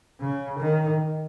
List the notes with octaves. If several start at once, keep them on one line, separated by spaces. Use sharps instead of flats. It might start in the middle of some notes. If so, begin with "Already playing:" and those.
C#3
D#3